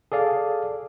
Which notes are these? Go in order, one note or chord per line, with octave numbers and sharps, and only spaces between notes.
G#4 A4 D5 F5